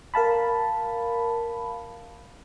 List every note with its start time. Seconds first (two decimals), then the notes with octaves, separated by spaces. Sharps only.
0.14 A#4 F5 A5 B5